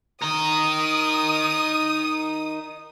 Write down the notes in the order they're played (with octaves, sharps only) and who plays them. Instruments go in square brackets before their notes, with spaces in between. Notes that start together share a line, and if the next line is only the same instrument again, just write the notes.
[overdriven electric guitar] D#4 A#4 [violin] D#6